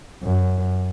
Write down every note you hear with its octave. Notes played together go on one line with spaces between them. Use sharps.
F#2